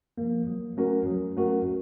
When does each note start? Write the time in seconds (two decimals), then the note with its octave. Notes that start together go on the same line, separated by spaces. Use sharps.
0.18 F3 A#3
0.47 F#3
0.77 A3 C#4 F#4 A#4
1.07 F#3
1.37 A3 C#4 F#4 A#4